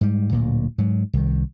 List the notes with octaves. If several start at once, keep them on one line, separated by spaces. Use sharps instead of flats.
G#2 G3
D1 D2 A#2
G#2 F#3
C2 D#3